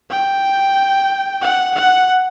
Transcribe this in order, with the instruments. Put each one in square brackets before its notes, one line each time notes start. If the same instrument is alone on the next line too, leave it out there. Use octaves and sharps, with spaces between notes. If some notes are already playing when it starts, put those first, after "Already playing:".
[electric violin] G5
F#5
F#5